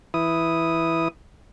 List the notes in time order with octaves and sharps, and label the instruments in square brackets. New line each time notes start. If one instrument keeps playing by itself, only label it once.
[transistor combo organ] E3 E4 D#6